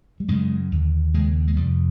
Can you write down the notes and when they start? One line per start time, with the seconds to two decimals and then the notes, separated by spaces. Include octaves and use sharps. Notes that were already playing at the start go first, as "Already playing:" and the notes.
0.20 G3
0.28 F#2 C#3 G#3
0.72 D#2 D3
1.14 D#2 C#3 G#3
1.47 G#3
1.56 F2 C3 G3